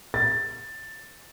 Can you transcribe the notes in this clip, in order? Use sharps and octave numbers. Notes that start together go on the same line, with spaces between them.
A6